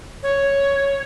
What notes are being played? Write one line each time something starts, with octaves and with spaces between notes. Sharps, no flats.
C#5